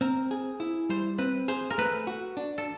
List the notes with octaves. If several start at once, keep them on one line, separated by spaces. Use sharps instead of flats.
C4 A#4
G#4
E4
G3 C5
C4 B4
G#4 C5
A#4
A3 B4
F#4
D4
A4